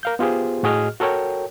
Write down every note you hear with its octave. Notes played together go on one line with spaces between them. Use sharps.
A#4 F5 G6
B3 F4 G4 G#4 C5
A2 F#4 G#4 D#5 F6
F#4 A4 A#4 C#5 G5